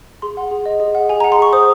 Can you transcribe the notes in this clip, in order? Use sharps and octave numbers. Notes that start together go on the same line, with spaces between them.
G#4 C6
F#5
G#4
D#5
G#4
F#5
G#4 G#5
A#5
F#5
C6
G#4 C#6
C5 D#6